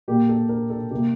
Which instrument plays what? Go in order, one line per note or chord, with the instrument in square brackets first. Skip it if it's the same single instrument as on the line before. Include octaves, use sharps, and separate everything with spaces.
[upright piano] A#2 G3 A#3 G4
A4
A#4
A4
C3 G3 A#3 G4